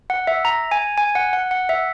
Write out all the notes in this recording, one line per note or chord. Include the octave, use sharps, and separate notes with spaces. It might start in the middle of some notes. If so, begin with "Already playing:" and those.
F#5
E5
A#5
G#5
G#5
F#5
F#5
F#5
E5